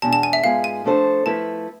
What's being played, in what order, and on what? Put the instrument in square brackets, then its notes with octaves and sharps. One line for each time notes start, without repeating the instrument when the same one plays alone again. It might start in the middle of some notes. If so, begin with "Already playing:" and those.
[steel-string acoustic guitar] E2 B2 G#3 D4 [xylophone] A5
[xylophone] A5
G#5
E5
[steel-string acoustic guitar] G#2 G#3 B3 F4 [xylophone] F5
[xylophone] G#5
[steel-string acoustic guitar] F3 A3 D4 A4 C5
[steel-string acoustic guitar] F3 A3 E4 B4 [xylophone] A5